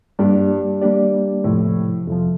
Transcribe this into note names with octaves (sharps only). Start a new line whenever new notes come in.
G2 G3 A#3 D4 G4 D5
G3 A#3 D4 G4 D5
F2 A2 C3 F3
F2 C3 F3